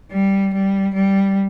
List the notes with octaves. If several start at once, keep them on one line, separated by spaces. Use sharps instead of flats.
G3
G3
G3